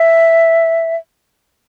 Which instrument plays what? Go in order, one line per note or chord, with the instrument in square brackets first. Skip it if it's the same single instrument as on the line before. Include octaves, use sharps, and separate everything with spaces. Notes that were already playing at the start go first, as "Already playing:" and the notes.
Already playing: [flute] E5